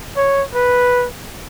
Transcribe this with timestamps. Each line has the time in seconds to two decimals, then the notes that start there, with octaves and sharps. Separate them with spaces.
0.16 C#5
0.54 B4